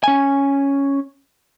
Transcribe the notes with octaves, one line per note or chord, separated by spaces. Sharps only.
C#4 G#5